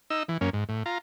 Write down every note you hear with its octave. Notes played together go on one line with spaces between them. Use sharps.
D#4 E6
E3
F#2 A#3 C#4
G#2
A2
F4 A#5